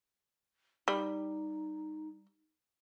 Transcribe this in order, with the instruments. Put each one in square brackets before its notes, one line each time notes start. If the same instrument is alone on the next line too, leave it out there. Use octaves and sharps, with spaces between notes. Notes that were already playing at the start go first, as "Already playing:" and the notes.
[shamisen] G3 [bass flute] D#4